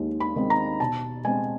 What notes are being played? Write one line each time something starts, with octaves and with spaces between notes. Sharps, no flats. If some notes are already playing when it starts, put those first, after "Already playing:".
Already playing: D#2 D#3 G#3
B5
D#3 G#3 C4
A#5
B2 A5
G#3 C4 G#5